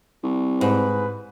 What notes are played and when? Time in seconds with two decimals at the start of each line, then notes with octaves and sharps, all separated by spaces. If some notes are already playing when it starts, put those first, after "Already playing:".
0.24 C2
0.61 G#2 B4